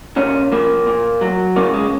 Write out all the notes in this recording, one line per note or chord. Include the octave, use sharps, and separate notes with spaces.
A#2 C#4
F3 A#3
A#2
F#3
C#3 A#3
G#3